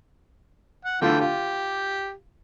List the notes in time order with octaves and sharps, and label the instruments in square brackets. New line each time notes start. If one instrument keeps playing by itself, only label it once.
[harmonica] F#5
[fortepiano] D3 A3 F4 [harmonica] E3 G5
[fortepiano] F4 [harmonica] G4